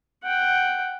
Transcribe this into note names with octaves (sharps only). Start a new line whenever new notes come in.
F#5 G5